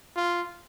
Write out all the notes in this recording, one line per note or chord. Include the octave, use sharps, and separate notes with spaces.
F4